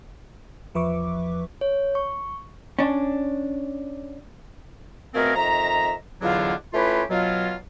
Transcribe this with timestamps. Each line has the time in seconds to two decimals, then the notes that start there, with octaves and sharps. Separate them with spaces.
0.74 E2 F3 B4 E5 C#6 D6
1.61 C#5
1.95 C#6
2.79 C#4 D4
5.14 B2 F3 A3 C4 G#4 A#4
5.36 F2 D#3 E5 A#5
6.22 E2 B2 D3 F#3 D4 F4
6.74 A3 C#4 E4 F4 G4 B4
7.10 B2 F#3 F4